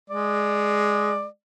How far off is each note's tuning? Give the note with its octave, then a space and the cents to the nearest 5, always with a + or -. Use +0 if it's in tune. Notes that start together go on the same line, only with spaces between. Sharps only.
G#3 +5 D5 +15